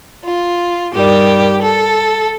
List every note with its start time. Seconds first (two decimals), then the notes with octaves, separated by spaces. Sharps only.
0.25 F4
0.93 G2 D#3 G3 G4
1.62 A4